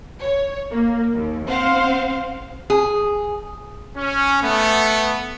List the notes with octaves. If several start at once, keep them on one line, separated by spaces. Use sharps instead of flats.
C#5
A#3
D#2
C4 C5 F5 F#5
G#4
C#4
A3 B3